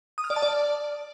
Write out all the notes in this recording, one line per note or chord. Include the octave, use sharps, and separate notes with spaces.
D#6
F6
D5
A5
D5